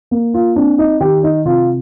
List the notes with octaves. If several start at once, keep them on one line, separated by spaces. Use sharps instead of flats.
A#3
F4
C4 D4
D#4
D#3 G4
D#4
C3 F4